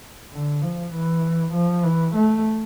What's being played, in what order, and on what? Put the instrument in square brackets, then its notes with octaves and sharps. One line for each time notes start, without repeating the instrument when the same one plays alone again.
[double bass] D3
F3
E3
F3
E3
A3